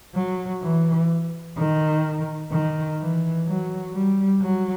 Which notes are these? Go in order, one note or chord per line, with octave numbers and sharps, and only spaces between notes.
F#3
E3
D#3
D#3
E3
F#3
G3
F#3